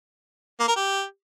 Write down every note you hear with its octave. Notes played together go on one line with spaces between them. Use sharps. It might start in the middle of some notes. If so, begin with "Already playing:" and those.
A#3
A#4
G4